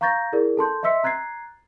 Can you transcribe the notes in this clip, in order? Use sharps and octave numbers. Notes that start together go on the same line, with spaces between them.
F5 A#5 C#6 G6 A6 A#6
E4 G#4 A#4 D5
A4 A5 C6 G6
D#5 E5 C6 E6 B6 C#7
A#5 F#6 G#6 A6 C7